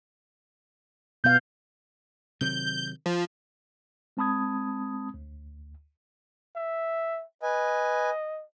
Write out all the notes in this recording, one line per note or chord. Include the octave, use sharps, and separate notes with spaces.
B2 B3 F5 G6
C3 D#3 F#3 G6
F3
G#3 C4 A5 B5 D#6 G#6
D2
E5
B4 D#5 G#5